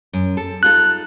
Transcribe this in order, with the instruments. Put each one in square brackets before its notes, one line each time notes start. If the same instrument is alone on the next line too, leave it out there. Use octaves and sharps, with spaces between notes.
[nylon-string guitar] F#2
A4
[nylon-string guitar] D#4 F4 A4 [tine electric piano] F#6